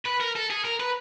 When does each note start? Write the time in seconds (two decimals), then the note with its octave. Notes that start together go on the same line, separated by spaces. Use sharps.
0.06 B4
0.21 A#4
0.36 A4
0.50 G#4
0.65 A#4
0.80 B4